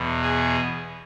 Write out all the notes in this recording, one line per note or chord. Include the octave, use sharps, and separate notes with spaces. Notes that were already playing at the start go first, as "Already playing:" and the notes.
Already playing: E2 B2
G#4